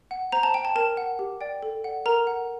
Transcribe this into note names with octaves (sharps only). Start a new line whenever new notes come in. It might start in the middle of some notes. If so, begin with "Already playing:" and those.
F#5
C5 A#5
A5
G5
A5
A#4 A5
F#5
G4
D5 G5
A4
D5 F#5
A#4 A#5
F#5